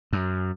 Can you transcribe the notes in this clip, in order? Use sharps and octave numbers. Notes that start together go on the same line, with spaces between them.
F#2